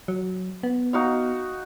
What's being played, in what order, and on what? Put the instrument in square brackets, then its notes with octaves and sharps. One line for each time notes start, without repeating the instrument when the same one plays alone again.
[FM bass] F#3
B3
[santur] D#4 F#4 F5